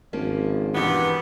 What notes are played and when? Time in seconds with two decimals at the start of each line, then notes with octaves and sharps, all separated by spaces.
0.13 G#1 F3 A#3 C#4
0.75 E2 G2 B2 E3 B3